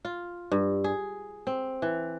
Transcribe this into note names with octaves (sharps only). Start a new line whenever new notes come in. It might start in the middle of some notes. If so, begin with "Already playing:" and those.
F4
G2
G#4
C4
E3